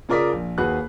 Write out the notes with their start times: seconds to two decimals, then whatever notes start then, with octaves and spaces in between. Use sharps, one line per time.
0.09 C#3 F4 A#4 D5 D#6 B6
0.33 A#1
0.58 D#2 F#4 G#4 B4 F#6